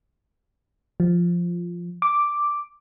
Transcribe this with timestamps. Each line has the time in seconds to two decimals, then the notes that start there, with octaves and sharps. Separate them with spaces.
1.00 F3
2.02 D6